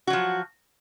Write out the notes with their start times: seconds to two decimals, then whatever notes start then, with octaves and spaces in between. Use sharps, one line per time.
0.07 F#4
0.10 F#3
0.13 F3